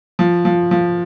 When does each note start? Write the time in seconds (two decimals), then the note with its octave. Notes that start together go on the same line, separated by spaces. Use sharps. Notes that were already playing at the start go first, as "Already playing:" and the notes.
0.19 F3
0.45 F3
0.71 F3